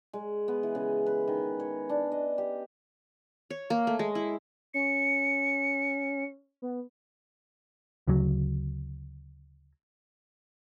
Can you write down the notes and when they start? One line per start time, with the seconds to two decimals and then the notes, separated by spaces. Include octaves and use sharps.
0.13 G#3
0.48 B3
0.63 E3
0.75 C#3
1.06 B4
1.28 D#3
1.60 C#5
1.89 D4
2.12 D#5
2.38 G4
3.50 C#5
3.70 A#3
3.87 A3
3.99 G#3
4.15 E4
4.74 C#4 C#7
6.62 B3
8.07 D2 C#3 F#3